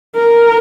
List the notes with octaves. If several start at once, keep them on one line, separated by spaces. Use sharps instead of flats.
A#4